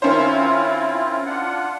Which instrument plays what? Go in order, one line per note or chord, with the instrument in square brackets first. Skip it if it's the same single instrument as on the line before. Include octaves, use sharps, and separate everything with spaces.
[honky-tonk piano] D#3 C#4 C5 [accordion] C4 E4 F4
[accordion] D4 F4 F#5